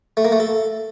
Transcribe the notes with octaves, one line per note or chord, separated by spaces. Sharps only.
A3
A#3
A3
A4